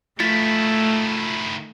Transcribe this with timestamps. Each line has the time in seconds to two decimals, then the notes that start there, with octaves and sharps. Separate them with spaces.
0.20 D#3 A3 E4 F4 A6 B6